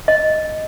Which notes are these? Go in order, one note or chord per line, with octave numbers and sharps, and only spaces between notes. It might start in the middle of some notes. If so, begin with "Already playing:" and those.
D#5